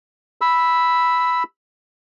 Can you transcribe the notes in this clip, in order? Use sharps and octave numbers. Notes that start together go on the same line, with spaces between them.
B5 E6